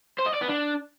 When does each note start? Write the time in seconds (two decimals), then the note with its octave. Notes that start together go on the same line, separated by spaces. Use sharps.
0.18 C5
0.26 D#5
0.34 D5
0.41 B3
0.49 D4